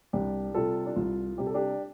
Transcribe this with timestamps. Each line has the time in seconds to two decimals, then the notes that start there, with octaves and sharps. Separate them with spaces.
0.13 C2 D4 G4
0.54 C3 G3 F4 A4
0.86 D4
0.96 C2 F4
1.38 C3 G3 G4
1.47 A4
1.54 D4 G4